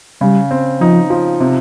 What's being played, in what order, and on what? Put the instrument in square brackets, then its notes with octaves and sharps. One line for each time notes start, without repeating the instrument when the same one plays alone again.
[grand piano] C#3 [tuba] G3
[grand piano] C4
[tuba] F3 [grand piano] D#4
[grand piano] F3
C3